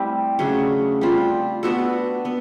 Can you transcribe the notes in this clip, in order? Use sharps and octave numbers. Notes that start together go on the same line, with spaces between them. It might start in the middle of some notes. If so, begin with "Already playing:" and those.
Already playing: G3 A3 C4 E4
C#3 F#3 A3 D4
G3 C4 F4
B3 D4 F#4 A4
B3